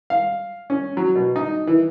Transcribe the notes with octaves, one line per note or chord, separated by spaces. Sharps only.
F5
C#4
F#3
B2
D#4
E3